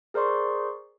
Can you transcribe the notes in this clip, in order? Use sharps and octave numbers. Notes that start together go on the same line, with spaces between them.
G#4 A#4 C5 D5 C6 C#6